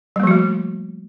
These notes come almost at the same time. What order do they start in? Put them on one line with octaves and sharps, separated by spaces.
G3 A#3 F3 F#4 A3